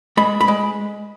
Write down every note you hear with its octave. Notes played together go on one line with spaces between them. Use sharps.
G#3 B5
B5
G#3